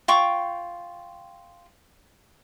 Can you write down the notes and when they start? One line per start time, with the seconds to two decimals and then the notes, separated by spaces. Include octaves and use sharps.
0.08 F4 G5 C#6 D6